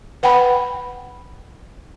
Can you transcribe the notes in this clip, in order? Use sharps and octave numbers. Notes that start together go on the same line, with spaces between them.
B4 F#5 G5 B5